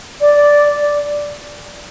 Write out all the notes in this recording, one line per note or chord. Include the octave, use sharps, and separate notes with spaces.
D5